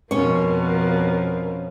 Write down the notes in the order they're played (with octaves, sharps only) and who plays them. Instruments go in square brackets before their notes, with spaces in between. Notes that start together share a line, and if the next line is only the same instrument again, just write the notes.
[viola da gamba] F2 B2 F3 [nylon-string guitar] C#4 C#5 [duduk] A#4